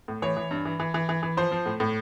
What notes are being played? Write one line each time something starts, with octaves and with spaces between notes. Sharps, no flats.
A2
E3 C#5
E3
G2
E3
E3
E3
E3
E3
F3 C5
F3
A2
A2